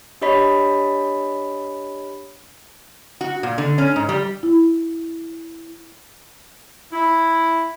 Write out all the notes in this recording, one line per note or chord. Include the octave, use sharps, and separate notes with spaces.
D4 G4 C#5 D#5 B5 B6
F#4
A#2
D3
C#4
G#2
G3
E4
E4